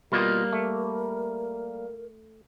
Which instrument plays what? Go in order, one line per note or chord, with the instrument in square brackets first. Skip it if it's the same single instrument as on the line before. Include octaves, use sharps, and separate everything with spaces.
[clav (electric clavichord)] B2 F4 D#5 [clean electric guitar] G3 A#3 [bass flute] A#4
[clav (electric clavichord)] A3